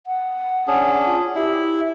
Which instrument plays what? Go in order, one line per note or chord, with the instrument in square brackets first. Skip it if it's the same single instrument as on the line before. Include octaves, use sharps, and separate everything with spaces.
[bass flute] F#5
[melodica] C#4 D4 G#4
[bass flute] F4
[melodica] E4 [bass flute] G4